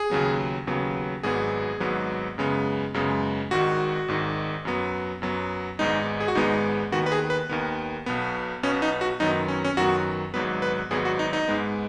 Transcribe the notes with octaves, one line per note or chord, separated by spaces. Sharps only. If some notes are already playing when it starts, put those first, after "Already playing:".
Already playing: G#4
D#2 C#3 F#3 B3
D#2 C#3 F#3 B3
G#1 G#2 F#3 B3 G#4
G#1 G#2 F#3 B3
F#2 C#3 G#3 B3
F#2 C#3 G#3 B3
G#1 G#2 D#3 F#4
G#1 G#2 D#3
F#2 F#3 B3
F#2 F#3 B3
G#1 G#2 G#3 B3 D#4
G#4
F#4
G#1 G#2 G#3 B3 D#4
D#2 D#3 B3 F#4
B4
G#4
B4
D#2 D#3 B3
B1 B2 B3
B1 B2 B3 C#4
D#4
F#4
F#2 D#3 F#3 B3 D#4
C#4
C#4
F#2 D#3 F#3 B3 F#4
G#1 G#2 F#3 B3 B4
B4
G#1 G#2 F#3 B3 G#4
F#4
D#4
D#4
G#2 G#3 B3